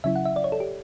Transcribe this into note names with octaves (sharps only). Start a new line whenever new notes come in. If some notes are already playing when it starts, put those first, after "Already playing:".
C#3 F#3 C#4 E4 E5
F#5
E5
D5
C#5
A4
G4